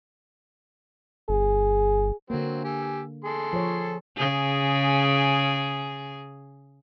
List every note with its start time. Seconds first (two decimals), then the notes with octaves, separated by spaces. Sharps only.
1.29 G1 G#4
2.30 D3 F#3 A#3 C4
2.64 G4 G#5 E6
3.24 G#4 A4 C6
3.53 F3 C#5
4.17 C#3 G#4